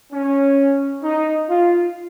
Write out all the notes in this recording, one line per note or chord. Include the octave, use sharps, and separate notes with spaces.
C#4
D#4
F4